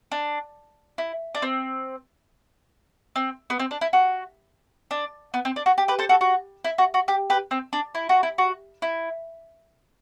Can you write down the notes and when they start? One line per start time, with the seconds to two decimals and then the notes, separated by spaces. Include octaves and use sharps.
0.12 D4
0.98 E4
1.35 D4
1.42 C4
3.16 C4
3.50 B3
3.59 C4
3.71 D4
3.81 E4
3.93 F#4
4.91 D4
5.34 B3
5.45 C4
5.56 D4
5.66 F#4
5.78 G4
5.88 G4 B4
5.99 A4 C5
6.09 F#4 A4
6.21 F#4
6.64 E4
6.78 F#4
6.94 F#4
7.08 G4
7.30 G4 B4
7.51 C4
7.73 D4
7.95 E4
8.09 F#4
8.23 E4
8.38 F#4
8.82 E4